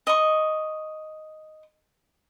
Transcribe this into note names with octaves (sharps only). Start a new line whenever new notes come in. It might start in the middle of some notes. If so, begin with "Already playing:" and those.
D#5 C#6